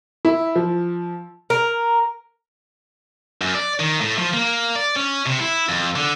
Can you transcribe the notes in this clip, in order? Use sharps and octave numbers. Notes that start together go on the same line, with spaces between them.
E4
F3
A#4
F#2
D5
D#3
A2
F3
A#3
D5
C#4
C3
E4
F2
D3